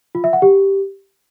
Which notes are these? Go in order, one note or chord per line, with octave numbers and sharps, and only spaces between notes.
F4
E5
F#5
G4